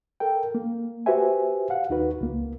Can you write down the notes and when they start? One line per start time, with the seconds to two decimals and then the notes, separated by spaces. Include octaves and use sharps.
0.20 A4 A#4 G5
0.55 A#3
1.06 F#4 G4 B4 C5 E5 G#5
1.70 F5 F#5
1.90 D#2 D#4 F#4 B4
2.21 C#2 A#3